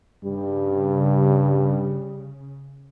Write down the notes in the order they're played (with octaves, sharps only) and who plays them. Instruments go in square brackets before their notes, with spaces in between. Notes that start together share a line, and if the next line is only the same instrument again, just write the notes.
[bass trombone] G2 [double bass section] C#3 [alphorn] G3